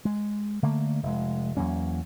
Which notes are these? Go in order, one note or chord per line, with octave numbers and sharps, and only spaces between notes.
G#3
D3 A3 A#3
F1 G#3
E2 F#3 A#3 C#4